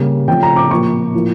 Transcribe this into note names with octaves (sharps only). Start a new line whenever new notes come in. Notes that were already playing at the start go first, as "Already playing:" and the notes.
Already playing: C#3 G3 A#3
C#3 F3 A3 G5
A#5
D6
A#2 F3 A#3 C#6
A2 F3 A#3